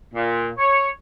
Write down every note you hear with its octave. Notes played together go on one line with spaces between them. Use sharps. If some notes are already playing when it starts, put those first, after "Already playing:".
A#2
C#5